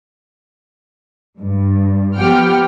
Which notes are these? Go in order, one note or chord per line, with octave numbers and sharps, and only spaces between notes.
G2
F3 B3 G4 F#5 G5 F6